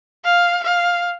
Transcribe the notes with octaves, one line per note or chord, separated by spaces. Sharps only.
F5
F5